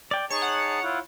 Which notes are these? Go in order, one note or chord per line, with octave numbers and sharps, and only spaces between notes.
D5 G5
D#4 G#4 C#5 A5 C#6
F#5
E4 F4 F#5